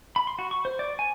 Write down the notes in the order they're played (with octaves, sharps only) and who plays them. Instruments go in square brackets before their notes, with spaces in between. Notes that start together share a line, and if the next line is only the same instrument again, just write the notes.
[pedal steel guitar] B5
C6
F#4
C#6
C5
D5
G#5